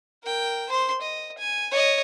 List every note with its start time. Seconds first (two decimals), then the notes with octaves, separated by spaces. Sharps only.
0.23 A#4 G5
0.70 C5 C6
1.02 D#5
1.38 G#5
1.71 C#5 D#5